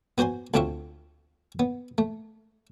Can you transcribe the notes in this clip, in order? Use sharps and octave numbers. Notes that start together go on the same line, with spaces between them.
B3 F#4 C5 G#5 C6
D2 D3 C4 F4 E5 C#6
B3
A3